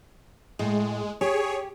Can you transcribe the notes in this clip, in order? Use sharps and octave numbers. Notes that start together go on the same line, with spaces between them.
A2 G#3
G4 G#4 C#5